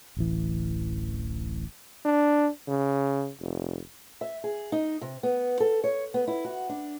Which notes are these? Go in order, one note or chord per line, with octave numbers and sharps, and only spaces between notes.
D1 A1 E3
D4
C#3
F1
E5
G#4
D#4
C3
B3
A4
C#5
B3
E4
F#4
D4